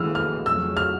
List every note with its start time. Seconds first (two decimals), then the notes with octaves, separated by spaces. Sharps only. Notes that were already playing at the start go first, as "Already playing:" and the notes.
Already playing: D#2 C#3 E3 G#3 E6 F6
0.15 F6
0.46 F2 C#3 F#3 A3 E6
0.77 F6